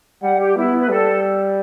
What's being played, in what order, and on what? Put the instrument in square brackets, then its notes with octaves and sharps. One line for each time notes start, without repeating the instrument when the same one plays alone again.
[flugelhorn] G3 [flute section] F#5
[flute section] G4
[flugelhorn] B3 [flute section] E4
[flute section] B4
[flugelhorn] G3 [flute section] A4